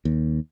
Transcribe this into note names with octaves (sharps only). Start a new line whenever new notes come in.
D#2